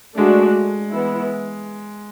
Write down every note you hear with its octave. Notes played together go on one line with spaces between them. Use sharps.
G#3 A3 D4 F#4
E3 B3 E4